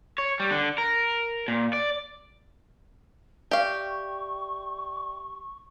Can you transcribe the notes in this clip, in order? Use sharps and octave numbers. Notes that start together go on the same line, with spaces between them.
C#5
G3
D3
A#4
A#2
D5
G4 D5 E5 F5 G5 C#6